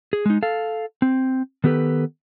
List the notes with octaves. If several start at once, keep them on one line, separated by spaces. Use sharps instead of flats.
G#4
G#3 D#4
A4 F5
C4
D#3 B3 G4 A4 B4